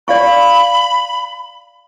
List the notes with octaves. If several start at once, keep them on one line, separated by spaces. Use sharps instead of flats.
D5 F5 B5 C#6